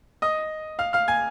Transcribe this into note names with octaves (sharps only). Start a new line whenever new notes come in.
D#5 D#6
F5 F6
F5 F6
G#5 G#6